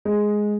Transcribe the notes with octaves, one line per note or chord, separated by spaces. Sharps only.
G#3